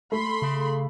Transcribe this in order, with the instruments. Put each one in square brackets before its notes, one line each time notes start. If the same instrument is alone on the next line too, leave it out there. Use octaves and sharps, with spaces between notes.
[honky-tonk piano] A3 [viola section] B5 C6
[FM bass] C#3